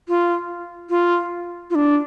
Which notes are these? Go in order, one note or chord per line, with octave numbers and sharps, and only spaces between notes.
F4
F4
F4
D4